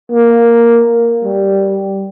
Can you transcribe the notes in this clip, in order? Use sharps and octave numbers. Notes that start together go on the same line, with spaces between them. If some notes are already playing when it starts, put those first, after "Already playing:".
A#3
G3